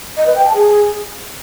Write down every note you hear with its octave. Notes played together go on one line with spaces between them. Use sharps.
D#5
B4
G5
A5
G#4